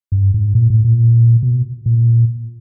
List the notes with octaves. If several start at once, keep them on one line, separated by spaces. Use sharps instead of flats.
G2
G#2
A#2
A2
A#2
B2
A#2